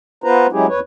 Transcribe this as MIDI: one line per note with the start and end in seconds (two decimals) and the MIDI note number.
0.24 0.47 59
0.24 0.47 65
0.24 0.47 71
0.24 0.47 72
0.24 0.47 82
0.52 0.67 54
0.52 0.67 56
0.52 0.67 61
0.52 0.67 64
0.52 0.67 67
0.52 0.67 68
0.68 0.80 40
0.68 0.80 71
0.68 0.80 73